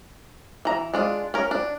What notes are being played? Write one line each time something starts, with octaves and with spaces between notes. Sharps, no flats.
E3 A#5
G#3 D4 F4
C#4 A#4
D4